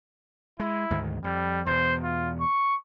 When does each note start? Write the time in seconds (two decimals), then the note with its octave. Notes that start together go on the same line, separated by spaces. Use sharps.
0.60 G#3 E4
0.90 D2 G#2 D#3
1.24 F2 G3
1.66 E2 B2 C5
2.03 F4
2.40 C#6